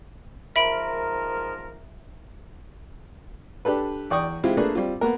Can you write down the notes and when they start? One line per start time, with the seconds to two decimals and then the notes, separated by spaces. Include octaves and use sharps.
0.56 G#2 F3 A#4 E5 B5 D7
3.65 D4 G4 A4 B4
4.11 E2 D5 G5 C#6 D#6
4.43 G#3 C4 E4 F4 G4
4.57 A3 A#3 D4 G#4 A4 B4
4.75 G3 C4 F4
5.01 A#3 B3 A#4